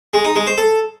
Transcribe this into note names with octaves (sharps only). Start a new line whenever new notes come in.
G#3
D#4
G#3
C5
A4